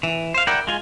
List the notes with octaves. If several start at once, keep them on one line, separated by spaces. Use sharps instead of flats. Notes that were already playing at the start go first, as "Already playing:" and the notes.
E3
C5 F5
E4 A#4 D5 F#5 G5
G#3 F4 G#5